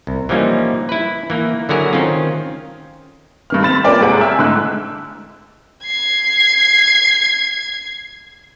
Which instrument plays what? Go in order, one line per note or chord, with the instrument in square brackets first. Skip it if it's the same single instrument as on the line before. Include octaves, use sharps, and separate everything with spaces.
[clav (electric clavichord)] C2
E3 F3 G3 A#3 C#4 D#4
E4 B4
E3 A#3
D3 F#3 E4 F#4 G#4 A#4
D#3 C4 C#4 F4
[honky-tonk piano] G2 D#3 F6
C4 B5 A6 E7
A#3 C#4 F4 A#4 D5 G5
G1 G#2 C3 G#4 F#5 D7
E5 G5 G#5 E6 F6
G#2 D3 A3 D#4 E6 F#6
[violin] G#6 C7